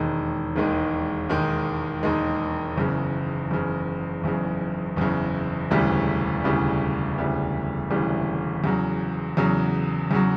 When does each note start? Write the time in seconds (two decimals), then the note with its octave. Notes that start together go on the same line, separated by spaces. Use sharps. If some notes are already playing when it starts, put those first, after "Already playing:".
Already playing: E1 D#2 D#3 G#3
0.56 E1 D#2 D#3 G#3
1.29 E1 D#2 D#3 G#3
2.03 E1 D#2 D#3 G#3
2.76 F#1 E2 C#3
3.50 F#1 E2 C#3
4.23 F#1 E2 C#3
4.96 F#1 E2 C#3
5.71 E1 D2 C#3 E3 G3
6.44 E1 D2 C#3 E3 G3
7.17 E1 D2 C#3 E3 G3
7.90 E1 D2 C#3 E3 G3
8.64 E2 C#3 F#3
9.37 E2 C#3 F#3
10.11 E2 C#3 F#3